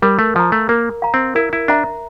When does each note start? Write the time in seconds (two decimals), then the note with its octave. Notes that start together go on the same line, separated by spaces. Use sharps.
0.02 G3 A#4
0.19 A3
0.35 F3 F5 A#5
0.52 A3
0.69 A#3 A#4
1.02 F5 A#5
1.14 C4
1.35 E4 A#4
1.53 E4
1.68 D4 E5 A#5